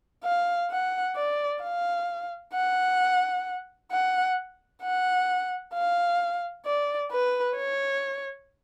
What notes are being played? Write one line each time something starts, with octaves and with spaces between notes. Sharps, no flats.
F5
F#5
D5
F5
F#5
F#5
F#5
F5
D5
B4
C#5